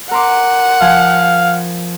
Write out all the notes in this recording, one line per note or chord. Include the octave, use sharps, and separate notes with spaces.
A#4 F#5 C6 D6
F3 F5 G#5